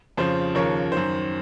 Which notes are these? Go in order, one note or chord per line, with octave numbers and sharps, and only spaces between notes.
F2 C#3 F3 C5
D#2 C#3 F3 A#4 C#5
F#2 D#3 C5